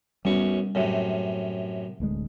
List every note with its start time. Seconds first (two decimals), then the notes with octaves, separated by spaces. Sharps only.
0.25 B1 F#2 G3 C#4 C#6
0.75 F#2 A2 C3
2.00 D1 D2 G#3